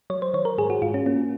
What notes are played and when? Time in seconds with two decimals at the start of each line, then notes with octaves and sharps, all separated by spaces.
0.10 F#3 C#5
0.22 C5
0.34 D#3 C#5
0.45 A#4
0.58 G#2 G#4
0.70 F#4
0.82 G#2 F4
0.94 C#4
1.06 A#3 C#4